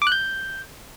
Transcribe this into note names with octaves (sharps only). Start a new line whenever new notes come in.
D6
F#6
G6